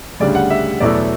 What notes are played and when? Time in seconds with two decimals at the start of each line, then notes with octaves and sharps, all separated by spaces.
0.20 D2 C#3 G3 D4 D5
0.35 F#5
0.50 E5
0.80 E2 B2 F#3 A3 E4 D5